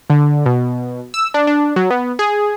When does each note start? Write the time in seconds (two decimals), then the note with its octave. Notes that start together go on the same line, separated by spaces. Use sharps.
0.10 D3
0.46 B2
1.14 E6
1.34 D4
1.47 D4
1.76 F#3
1.91 B3
2.19 G#4